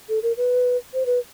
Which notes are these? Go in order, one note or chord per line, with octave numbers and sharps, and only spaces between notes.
A4
A#4
B4
C5
B4